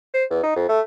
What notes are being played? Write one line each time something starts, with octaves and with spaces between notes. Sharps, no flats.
C5
E2
D#4
F2
A3